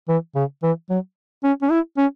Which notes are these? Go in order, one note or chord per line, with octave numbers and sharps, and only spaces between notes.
E3
C#3
E3
F#3
C#4
C#4
E4
C#4